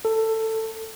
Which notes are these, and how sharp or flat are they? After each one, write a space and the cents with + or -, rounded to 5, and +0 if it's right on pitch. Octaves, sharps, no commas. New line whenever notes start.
A4 +15